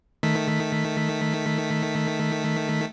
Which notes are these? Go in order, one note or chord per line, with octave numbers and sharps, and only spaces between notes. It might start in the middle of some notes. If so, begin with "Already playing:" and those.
D#3 A3 B6